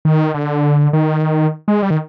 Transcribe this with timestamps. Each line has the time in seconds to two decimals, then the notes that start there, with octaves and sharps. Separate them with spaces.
0.05 D#3
0.34 D3
0.93 D#3
1.68 G#3
1.82 G3
1.91 D#3